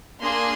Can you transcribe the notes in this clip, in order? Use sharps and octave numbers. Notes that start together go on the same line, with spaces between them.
A#3 D4 G#4 C6